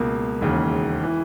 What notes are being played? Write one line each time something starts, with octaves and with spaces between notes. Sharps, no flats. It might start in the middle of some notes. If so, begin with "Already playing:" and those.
Already playing: C#2 B2 A#3
E1 D#2 C#3
E3